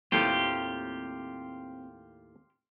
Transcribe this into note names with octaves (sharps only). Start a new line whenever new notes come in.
D#2 A2 C4 F4 G4 A5